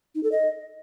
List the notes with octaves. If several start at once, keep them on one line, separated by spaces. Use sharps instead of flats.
D#4
A4
D#5